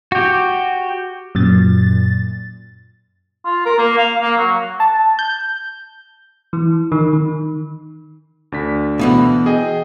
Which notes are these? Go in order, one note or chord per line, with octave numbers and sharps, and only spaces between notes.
F#4 G4
F#2 A#2 A6
F4
A#4
A#3
F5
A#3
F#3
A5
G6
E3
D#3
D#3
D2 D4 B6
B2 E3 B3
G#4 D#5 G5